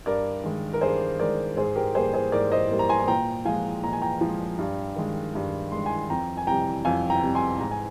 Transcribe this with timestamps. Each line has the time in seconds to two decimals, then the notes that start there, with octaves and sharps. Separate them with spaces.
0.06 G2 A#4 D5
0.44 D#3 G#3
0.73 A#4
0.81 G2 G#4 C5
1.19 D#3 G#3 A#4 D5
1.57 G#2 G#4 C5
1.76 G4 A#4
1.95 G3 A#3 G#4 C5
2.14 G#4 C5
2.32 G#2 A#4 D5
2.52 C5 D#5
2.71 G3 A#3
2.79 A#5
2.89 G#5 C6
3.00 G#5
3.08 A#2 G5 A#5
3.45 F3 G#3 F5 G#5
3.83 A#2 A#5
3.93 G#5
4.02 G5 A#5
4.21 F3 G#3
4.58 G2
4.96 D#3 G#3
5.35 G2
5.72 D#3 G#3 C6
5.86 G#5 C6
6.10 F2 G5 A#5
6.37 G#5
6.47 C3 G3 G5 A#5
6.85 F2 F5 G#5
7.10 G5 A#5
7.23 C3 G3
7.35 G#5 C6
7.60 G#2 A#5
7.71 G#5